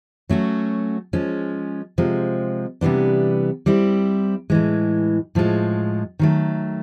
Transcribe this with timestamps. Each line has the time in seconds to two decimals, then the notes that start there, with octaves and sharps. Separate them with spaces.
0.29 F#3 A3 C#4 F#4
1.13 F3 G#3 C#4
1.98 C3 F3 G#3
2.81 C3 E3 G3 B3 D4
3.66 G3 C4 E4
4.50 A2 E3 G#3
5.35 A2 F3 G#3
6.19 D#3 F#3 A3